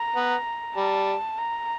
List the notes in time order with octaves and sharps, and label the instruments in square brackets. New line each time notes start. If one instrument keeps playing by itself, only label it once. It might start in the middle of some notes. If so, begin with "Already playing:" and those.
Already playing: [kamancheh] A#5
[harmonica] B3
[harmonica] G3 [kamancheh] A5
[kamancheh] A#5